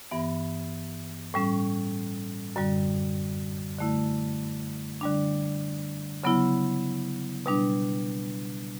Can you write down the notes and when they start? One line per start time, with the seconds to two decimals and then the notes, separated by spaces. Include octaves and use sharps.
0.11 G2 E3 B3
1.34 A2 G3 C#4
2.56 F#2 D3 G3
3.79 D3 A3 E4
5.01 D3 G3 D4
6.24 C#3 F#3 B3 E4
7.46 B2 G3 D4